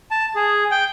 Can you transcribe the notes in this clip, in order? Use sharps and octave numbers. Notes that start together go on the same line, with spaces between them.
A5
G#4
G5